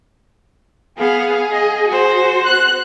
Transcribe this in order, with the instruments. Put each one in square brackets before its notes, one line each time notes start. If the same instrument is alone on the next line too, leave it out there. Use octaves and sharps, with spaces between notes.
[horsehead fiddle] B3 F5 [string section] G#4
[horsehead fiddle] D#5
F#4 C5
[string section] F#6